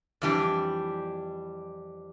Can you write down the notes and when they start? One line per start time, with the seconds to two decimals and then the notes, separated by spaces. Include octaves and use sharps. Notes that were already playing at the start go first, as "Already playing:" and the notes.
0.22 F2 E3 G3 D4